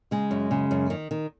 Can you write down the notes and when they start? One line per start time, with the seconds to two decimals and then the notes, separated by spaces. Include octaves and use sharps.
0.11 C#3 G#3
0.31 F#2
0.51 C#3
0.71 F#2
0.90 D#3
1.11 D#3